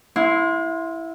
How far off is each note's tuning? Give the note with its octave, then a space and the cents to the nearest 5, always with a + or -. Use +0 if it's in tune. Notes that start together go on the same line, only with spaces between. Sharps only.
E4 +0 F5 +45 C6 +0